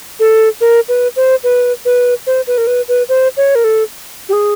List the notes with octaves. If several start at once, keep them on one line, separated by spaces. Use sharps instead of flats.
A4
A#4
B4
C5
B4
B4
C5
B4
A#4
B4
B4
C5
C#5
A#4
A4
G4
G#4